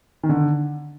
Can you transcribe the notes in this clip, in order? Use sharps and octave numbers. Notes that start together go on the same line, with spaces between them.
D#3
D3